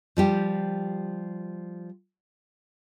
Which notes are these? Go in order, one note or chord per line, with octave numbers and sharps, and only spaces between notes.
F3 G3 G4